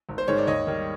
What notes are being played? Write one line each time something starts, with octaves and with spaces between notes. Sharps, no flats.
G#1
C5
G#2 D#3 G#3 C#5
D5
D#2 C#5 D#5
D#3 G3